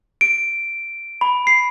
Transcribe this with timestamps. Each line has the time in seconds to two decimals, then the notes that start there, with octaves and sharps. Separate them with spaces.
0.21 D7
1.21 B5
1.47 C7